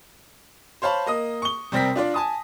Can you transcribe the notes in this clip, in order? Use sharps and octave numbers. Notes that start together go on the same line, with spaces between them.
C5 C#5 F5 A5 B5
A#3 D#5 D#6
C#6 G7
C3 G3 C4 A#4 A#6 B6
D4 F4 D5
G#5 A5 D#6